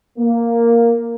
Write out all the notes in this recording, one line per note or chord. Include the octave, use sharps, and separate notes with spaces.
A#3